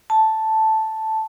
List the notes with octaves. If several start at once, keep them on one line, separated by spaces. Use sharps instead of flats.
A5